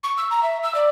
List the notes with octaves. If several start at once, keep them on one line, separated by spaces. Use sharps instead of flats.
C#6
E6
A#5
E5
E6
D5